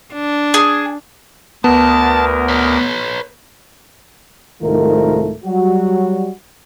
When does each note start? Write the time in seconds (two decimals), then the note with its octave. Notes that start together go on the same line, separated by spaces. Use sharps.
0.14 D4
0.54 G#4
1.64 D2 B3 A#4 A5
2.48 B4 C#5
4.62 C2 G#2 D#3 A3 F4 A#4
5.45 F#3 G3 F#4